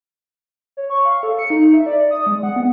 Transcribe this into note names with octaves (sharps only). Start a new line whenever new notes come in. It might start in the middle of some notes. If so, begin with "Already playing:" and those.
C#5
C#6
F5
A4
C#7
D#4
E5
D5
D#6
G#3
F#5
B3